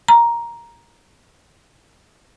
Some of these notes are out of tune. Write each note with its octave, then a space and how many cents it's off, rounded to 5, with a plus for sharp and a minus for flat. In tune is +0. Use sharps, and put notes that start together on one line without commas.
A#5 +10